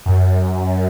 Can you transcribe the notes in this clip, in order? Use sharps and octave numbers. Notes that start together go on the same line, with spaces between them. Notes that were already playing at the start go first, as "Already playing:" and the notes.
F#2